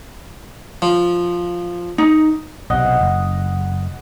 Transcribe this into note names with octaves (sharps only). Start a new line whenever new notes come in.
F3
D#4
B1 C3 D#5 F#5
F#1